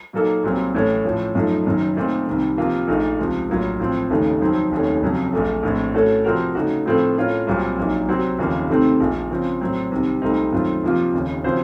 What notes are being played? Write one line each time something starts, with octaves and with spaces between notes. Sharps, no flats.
A#2 F#3 A#3 D#4 A4
C2 A#2 F#3 C4
A1 A2 A3 C#4
A2 F3 A3 C#4
F#2 F3 A3 D#4
F#1 F#2 D#3 F#3
A#2 A3 C4 D#4 A4
C2 C3 D#3
C3 F3 A#3 F4 A#4
A#1 A#2 A3 D#4
C#2 C3 F3
A#1 A2 F#3 A#3 F4
A2 F3 C4
F1 D#2 C#3 A3 D#4
F2 D#3 F#3 C4
F1 D#2 D#3 A3 C#4
F1 F2 C#3 F#3
A#1 A#2 A3
A#1 A2 A3 C4
A2 A3 C#4 F#4 A4
C3 F3 C4 F#4 A#4
C#3 A3 D#4 F#4
A2 F3 C4 F4 A4
A2 A3 C#4 F4 A#4
C2 A#2 F#3 C4 F4
A#1 A#2 F#3 A#3 D#4
C3 F#3 C4 F#4
F1 D#2 C#3 F3 A#3
C3 D#3 A3 C4
A#1 A#2 F3
C#3 F3 C4
A2 F#3 C4
C2 C3 D#3
C2 A#2 A3 C4 D#4
F#2 D#3 A3 C4 F4
F2 C3 F3 A#3 F4
F1 D#2 C#3
C#3 F3 C4 F#4 C5